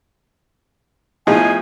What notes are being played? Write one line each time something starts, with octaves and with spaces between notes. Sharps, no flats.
A2 F3 A3 B3 D#4 E4 G#4 G#5